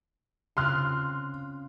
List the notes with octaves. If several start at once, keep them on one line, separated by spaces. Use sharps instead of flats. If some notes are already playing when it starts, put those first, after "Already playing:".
C#3 C4 F4 C6 F6 F#6